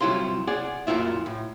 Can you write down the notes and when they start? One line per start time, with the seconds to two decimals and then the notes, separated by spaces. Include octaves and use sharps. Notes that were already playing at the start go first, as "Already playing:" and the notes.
0.01 C3 F#3 G3 E4 F4 C6
0.47 G#4 D5 F#5
0.87 F#2 A#2 E4 F4 E5
1.26 A2